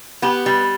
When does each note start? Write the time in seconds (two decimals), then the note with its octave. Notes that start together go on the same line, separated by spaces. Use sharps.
0.22 B3 G4
0.46 G3